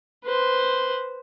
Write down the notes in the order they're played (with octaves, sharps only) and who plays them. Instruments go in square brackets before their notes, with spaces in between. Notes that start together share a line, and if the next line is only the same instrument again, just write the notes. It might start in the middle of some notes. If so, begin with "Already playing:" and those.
[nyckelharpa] B4 C5